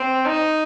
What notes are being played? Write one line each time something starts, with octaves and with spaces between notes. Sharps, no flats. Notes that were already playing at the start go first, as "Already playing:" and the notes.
Already playing: C4
D#4